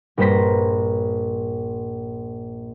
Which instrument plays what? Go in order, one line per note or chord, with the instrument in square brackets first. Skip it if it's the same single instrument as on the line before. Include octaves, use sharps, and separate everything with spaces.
[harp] A#1 G2 B4 C5 A#5 B6